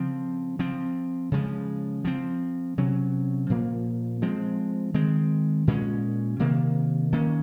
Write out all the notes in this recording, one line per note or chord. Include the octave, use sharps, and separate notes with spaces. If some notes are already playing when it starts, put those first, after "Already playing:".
Already playing: C#3 F3 C4
F3 C4
C#3 F3 G#3
F3 C4
C3 F#3 C#4
A#2 F3 A#3
F3 G#3 C4
D#3 G#3 C4
A#2 G#3 C#4
C3 D#3 A#3
D#3 A#3 C#4